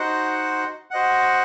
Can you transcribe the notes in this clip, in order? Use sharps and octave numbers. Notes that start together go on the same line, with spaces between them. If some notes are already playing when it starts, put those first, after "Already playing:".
Already playing: D#4 F#4 C5 F#5
F#4 C5 D#5 F#5